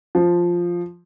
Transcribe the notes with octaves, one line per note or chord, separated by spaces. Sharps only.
F3